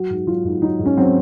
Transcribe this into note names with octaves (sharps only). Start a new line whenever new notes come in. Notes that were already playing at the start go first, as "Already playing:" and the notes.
Already playing: F#3 F#4
G#2
F#3 F4
G#2
F#3 D#4
G#2
C#4
F#3 C4